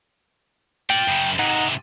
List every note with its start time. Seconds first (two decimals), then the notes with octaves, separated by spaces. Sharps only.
0.90 F4 D5 G5
1.08 F#2 C#3
1.39 G#2 C3 D#4 F#5